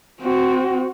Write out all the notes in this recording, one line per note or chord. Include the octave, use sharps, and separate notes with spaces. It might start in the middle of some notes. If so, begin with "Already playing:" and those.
C4 F#4